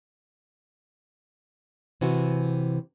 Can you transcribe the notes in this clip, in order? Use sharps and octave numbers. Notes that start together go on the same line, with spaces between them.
C3 E3 F#4